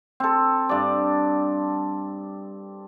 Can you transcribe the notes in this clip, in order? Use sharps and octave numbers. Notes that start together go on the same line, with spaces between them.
C4 A4
G2 D5